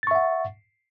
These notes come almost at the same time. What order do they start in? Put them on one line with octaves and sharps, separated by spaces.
A6 C#6 E5 F#5